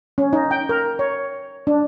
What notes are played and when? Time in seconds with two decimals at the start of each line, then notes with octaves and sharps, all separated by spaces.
0.18 C#4
0.33 D#4
0.51 G5
0.69 A#4
0.99 C#5
1.67 D4